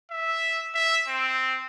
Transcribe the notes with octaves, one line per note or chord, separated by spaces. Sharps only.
E5
E5
C4